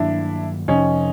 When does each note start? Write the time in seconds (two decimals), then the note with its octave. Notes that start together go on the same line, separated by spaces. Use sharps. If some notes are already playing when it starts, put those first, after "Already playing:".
Already playing: G2 D#3 F#3 A#3 D4 E4
0.68 F2 C3 F3 C#4 D#4